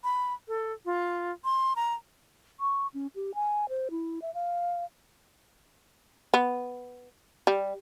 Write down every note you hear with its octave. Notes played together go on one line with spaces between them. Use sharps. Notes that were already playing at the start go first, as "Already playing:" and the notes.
B5
A4
F4
C6
A#5
C#6
C#4
G4
G#5
C5
E4
E5
F5
B3
G3